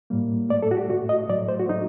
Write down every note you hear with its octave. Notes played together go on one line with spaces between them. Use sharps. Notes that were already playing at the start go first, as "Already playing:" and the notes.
A2 G3 A#3
A2 A3 D5
A4
F#4
G4
A2 A3 F#4
D#5
A2 F#3 A3 D5
C5
F#4
A2 F#3 A3 D#4